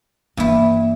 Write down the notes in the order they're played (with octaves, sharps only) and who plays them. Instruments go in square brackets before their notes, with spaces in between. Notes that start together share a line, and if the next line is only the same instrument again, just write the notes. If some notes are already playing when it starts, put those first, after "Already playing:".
[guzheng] G2 E4 [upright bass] E3 A#3